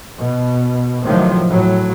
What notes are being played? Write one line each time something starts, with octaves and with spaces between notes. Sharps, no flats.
B2
A2 C3 D#3 F3 F#3
A2 F#3